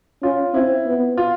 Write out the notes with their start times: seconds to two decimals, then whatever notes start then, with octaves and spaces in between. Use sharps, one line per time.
0.23 C#4 F4
0.54 C4 E4
0.86 B3
1.18 F4